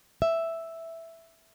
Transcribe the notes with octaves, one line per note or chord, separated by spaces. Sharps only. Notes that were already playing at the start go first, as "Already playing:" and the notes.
E5